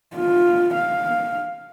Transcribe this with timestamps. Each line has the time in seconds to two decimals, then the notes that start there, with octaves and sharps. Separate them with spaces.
0.16 F4
0.75 F5